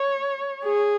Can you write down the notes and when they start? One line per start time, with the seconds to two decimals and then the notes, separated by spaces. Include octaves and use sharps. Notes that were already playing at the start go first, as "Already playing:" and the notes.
Already playing: C#5
0.64 G#4